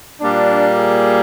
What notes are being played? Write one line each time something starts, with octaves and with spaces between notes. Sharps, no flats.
A#2 G3 A#3 D4
G#4